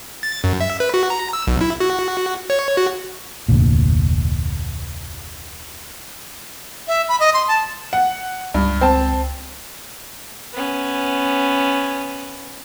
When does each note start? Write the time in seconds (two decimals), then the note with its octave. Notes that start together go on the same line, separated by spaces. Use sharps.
0.23 A6
0.44 F#2
0.61 E5
0.80 B4
0.94 F#4
1.10 A#5
1.33 E6
1.47 B1
1.61 E4
1.80 F#4
2.50 C#5
2.77 F#4
3.48 F1 D2 A#2
6.88 E5
7.09 B5
7.20 D#5
7.34 C6
7.48 A5
7.93 F#5
8.54 C#2 G2
8.81 C4 A5
10.54 B3 C#4